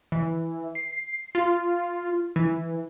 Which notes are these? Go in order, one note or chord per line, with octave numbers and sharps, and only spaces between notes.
E3
C7
F4
E3